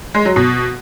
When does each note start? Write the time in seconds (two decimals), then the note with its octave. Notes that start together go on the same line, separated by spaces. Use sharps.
0.14 G#3
0.25 F#3
0.36 B2